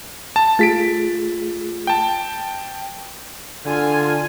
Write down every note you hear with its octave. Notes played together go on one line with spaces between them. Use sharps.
A5
A3 F4 G#4 A6 B6 D7
G5 A5
D3 F4 G#5